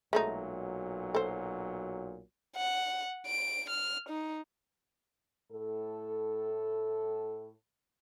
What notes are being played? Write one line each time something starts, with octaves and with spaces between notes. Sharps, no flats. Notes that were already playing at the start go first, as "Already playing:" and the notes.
B1 A#2 F#3 G#3 A3 D#4
A4 C5
F#5
D7
F6
D#4
A2 A4